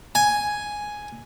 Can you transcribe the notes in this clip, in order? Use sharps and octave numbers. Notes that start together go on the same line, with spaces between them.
G#5